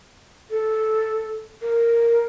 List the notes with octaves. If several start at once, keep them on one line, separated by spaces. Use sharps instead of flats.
A4
A#4